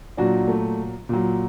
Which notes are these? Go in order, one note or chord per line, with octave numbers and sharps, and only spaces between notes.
A#2 F#3 D4 F#4
A3
A#2 F#3